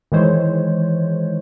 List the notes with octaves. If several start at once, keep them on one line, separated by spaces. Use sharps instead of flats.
D#3 E3 G#3 C5 C#5